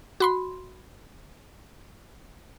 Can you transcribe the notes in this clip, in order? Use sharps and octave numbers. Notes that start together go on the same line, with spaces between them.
F#4 B5 C6